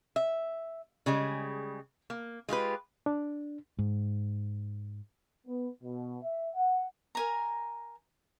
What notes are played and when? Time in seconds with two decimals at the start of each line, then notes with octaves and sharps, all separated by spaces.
0.16 E5
1.06 C#3 G3 G#3
2.10 A#3
2.49 G#3 F4 G4 B4
3.06 D4
3.79 G#2
5.47 B3
5.83 B2
6.23 E5
6.55 F#5
7.15 A#4 G#5 A#5